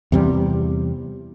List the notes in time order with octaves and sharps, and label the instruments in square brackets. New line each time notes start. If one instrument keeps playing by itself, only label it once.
[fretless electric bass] E2 C3 G3